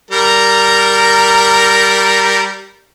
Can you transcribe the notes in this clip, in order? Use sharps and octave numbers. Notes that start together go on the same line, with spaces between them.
G3 A#4 A#5